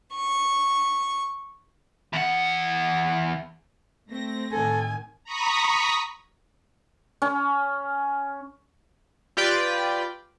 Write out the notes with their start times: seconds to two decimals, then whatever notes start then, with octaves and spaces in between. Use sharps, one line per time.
0.15 C#6
2.13 E2 F#5
4.10 A3 C4 A#6
4.52 A2 D#3 A4 G#5
5.24 A#5 B5 C#6 D#6 B6
7.22 C#4
9.37 F4 G4 B4 D5 G5